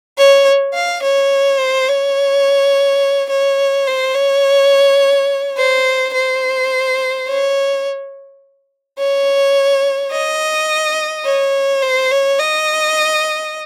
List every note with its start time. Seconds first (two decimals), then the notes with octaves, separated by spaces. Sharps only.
0.18 C#5
0.74 F5
1.03 C#5
1.59 C5
1.89 C#5
3.29 C#5
3.87 C5
4.15 C#5
5.57 C5
6.14 C5
7.28 C#5
8.99 C#5
10.12 D#5
11.25 C#5
11.82 C5
12.11 C#5
12.39 D#5